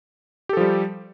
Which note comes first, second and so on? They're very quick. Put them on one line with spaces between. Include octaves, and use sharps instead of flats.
G4 A4 F3 G3